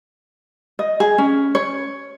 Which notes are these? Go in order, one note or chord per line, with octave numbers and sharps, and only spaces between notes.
D#5
G#4
C#4
C#5